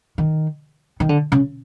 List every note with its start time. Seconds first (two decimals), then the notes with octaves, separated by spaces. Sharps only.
0.18 D#3
1.00 D#3
1.09 D3
1.32 C#3